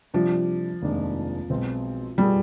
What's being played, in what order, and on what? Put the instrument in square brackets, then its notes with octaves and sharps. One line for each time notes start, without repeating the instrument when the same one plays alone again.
[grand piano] C3 G3 D4 G4 [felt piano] F3
[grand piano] F1 D#2 D#3 G#3 D4
B1 B2 G#3 C4
[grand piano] B2 B3 F4 G#4 [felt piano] G3